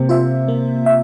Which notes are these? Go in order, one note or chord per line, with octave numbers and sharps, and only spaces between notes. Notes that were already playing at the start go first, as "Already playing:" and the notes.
Already playing: C3 A#3
F4 C5 E5
A#3
E5